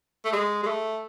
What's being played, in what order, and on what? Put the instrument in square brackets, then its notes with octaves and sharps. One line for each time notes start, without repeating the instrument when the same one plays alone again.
[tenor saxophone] A3
G#3
G#3
A3